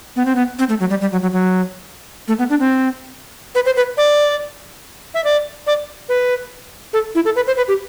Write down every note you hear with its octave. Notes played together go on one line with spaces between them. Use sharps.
B3
C4
B3
C4
A3
F#3
G3
G3
F#3
F#3
F#3
A3
B3
D4
C4
B4
C5
B4
D5
E5
D5
D5
B4
A4
E4
A4
B4
C5
B4
G4